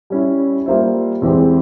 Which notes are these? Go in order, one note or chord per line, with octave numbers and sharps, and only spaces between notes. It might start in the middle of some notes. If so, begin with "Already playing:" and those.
G3 C#4 E4
G3 A#3 F4 C5 E5
E2 E3 G#3 C4 G4